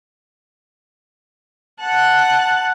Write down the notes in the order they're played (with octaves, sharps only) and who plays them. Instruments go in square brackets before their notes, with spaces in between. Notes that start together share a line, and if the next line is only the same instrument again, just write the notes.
[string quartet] F#5 A5 F#6